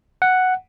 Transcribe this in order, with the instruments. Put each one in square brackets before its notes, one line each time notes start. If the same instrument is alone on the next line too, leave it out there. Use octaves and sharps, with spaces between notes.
[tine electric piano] F#5